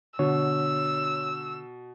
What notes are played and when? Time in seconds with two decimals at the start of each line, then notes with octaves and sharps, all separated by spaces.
0.19 B2 D3 C#5 E6